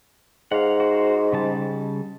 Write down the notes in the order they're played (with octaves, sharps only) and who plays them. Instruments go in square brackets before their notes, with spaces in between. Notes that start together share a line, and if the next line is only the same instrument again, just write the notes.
[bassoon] G#2 [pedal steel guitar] F5 F#5
[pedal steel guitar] F#4 C5
C#3 G3 A5